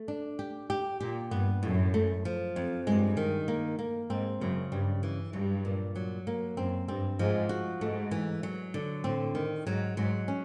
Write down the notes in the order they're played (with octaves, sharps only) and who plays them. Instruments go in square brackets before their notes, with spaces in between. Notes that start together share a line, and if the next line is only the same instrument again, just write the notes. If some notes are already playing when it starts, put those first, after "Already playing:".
Already playing: [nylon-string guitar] A3
D4
G4
G4
[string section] A#2 [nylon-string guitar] G4
[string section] G2 [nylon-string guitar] B3
[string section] F#2 [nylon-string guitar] A2
[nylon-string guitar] A3
F3
F2
[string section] G2 [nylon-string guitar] G#3
[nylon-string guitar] D#3
A#3
A#3
[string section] G#2 [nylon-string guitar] C4
[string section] F#2 [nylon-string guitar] C#3
[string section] G2 [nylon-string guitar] G3
[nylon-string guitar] E3
[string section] G2 [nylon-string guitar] F#3
[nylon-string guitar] A#2
F#3
A#3
[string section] F#2 [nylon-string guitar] C4
[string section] G2 [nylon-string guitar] C4
[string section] G#2 [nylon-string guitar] F3
[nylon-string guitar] F#4
[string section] G#2 [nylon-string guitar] A3
[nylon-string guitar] E3
F#3
D3
[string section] A2 [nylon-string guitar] C4
[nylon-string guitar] D#3
[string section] G#2 [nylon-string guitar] F#3
[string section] G#2 [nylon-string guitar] F#3
[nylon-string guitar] C#4